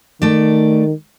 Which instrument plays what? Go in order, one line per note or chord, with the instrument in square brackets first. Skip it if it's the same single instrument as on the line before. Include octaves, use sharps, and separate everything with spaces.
[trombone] D#3 [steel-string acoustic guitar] A3 D5